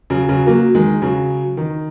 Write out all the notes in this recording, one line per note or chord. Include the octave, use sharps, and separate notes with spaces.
C#3 F#3
C#3 F#3
F#3 A#3
D#3 G#3
C#3 F#3
D#3